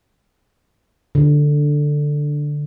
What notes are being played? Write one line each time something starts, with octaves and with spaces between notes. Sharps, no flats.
D3